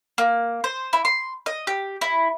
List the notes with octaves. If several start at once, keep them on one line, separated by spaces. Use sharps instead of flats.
A#3
C5
E4
C6
D#5
G4
E4